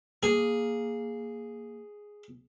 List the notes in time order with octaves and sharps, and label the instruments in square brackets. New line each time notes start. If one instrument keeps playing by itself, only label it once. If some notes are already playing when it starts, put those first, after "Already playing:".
[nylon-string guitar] A#3 [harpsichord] G#4